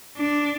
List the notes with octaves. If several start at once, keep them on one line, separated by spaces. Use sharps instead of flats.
D4